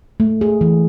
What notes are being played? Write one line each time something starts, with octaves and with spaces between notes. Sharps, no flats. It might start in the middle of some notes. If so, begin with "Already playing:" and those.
A3
G#4
E3